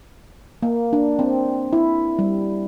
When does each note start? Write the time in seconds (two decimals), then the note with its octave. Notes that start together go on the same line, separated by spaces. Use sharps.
0.63 A#3
0.93 D4
1.19 C4
1.73 E4
2.19 G3